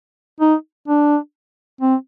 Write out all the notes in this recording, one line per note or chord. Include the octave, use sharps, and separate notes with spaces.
D#4
D4
C4